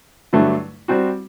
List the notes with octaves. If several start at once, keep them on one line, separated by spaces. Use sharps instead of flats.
G2 D3 F#3 A3
G3 C4 F#4